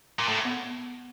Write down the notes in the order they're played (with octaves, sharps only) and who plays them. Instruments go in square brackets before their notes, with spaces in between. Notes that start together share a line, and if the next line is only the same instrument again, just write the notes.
[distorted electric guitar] A#2
A2
[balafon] B3